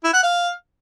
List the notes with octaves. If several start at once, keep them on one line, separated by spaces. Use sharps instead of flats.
E4
F#5
F5